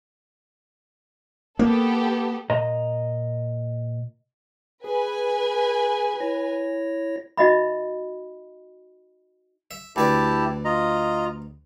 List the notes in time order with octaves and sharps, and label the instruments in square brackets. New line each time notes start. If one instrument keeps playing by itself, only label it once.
[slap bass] A#3 [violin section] B3 G4 A4
[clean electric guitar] A#2 D#5 A#5
[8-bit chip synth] G#4 [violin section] B4 G#5
[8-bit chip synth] E4 C#5 A#6
[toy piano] D#4 F#4 D#5 E5 B5
[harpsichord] E5
[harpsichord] D2 B4 D5 [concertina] E4 G4 A5
[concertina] F4 D#5 A#5